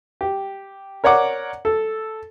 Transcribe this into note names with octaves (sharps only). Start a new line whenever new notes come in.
G4
A#4 C#5 D5 F#5 D6
A4